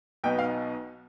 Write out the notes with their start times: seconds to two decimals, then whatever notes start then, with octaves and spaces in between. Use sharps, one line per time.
0.24 B1 B2 B3 D#4 G5
0.39 F5